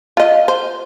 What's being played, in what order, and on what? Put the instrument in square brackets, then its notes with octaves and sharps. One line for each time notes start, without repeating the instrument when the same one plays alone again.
[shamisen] F4 D#5
C5